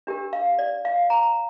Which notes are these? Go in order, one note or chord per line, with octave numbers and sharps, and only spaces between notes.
D4 G4 A#4
F5
D5
F5
A#5